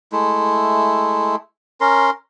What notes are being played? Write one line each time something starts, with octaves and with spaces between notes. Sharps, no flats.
G#3 A3 E4
C#4 A#4 C6